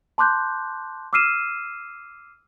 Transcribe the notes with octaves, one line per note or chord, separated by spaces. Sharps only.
A5 C6 D6 F#6 G6
D6 E6 F6 C7 D#7 E7